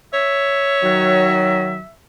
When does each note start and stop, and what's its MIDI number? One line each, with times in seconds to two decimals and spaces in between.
0.14 1.35 73
0.14 1.94 76
0.83 1.81 51
0.83 1.81 54